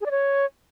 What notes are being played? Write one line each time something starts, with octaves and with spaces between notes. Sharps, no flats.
G#4
D5
C#5